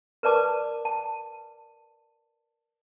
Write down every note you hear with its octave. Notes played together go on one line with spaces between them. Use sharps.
A#4 B4 D5 A5 D6
A5